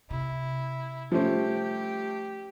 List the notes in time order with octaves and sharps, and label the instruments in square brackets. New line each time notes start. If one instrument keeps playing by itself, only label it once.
[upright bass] C3 [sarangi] E4
[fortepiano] F3 C#4 [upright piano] G3 A3 C5 [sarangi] G4